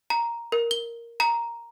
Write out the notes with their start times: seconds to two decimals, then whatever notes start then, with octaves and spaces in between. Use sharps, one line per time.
0.10 A#5
0.52 A#4
0.71 G7
1.20 A#5